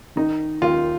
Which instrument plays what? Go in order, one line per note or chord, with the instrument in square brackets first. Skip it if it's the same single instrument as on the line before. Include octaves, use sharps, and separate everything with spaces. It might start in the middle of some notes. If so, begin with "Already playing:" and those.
[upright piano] D#3 D#4
D#2 F4